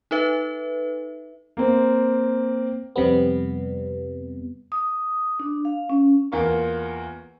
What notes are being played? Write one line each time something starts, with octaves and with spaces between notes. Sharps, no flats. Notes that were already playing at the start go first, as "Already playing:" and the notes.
D#4 A4 B4 E5
A#3 C4
F2 C3 G3 B3
D#6
D4
F5
C#4
E2 A#3 F4 A#4 C#6